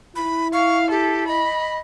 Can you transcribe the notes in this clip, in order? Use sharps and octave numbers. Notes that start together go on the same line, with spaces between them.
E4 B5
F5 C#6
G4 A4
D#5 B5